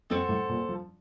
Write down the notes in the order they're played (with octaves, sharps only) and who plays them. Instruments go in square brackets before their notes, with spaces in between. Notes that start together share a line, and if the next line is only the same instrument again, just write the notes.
[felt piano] F2 [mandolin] C4 F#4 A4
[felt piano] A2
A#2
F3